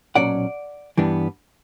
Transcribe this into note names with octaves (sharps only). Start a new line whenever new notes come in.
B1 A#2 F#3 C#4 D5 F#5
G2 E3 G3 B3 D4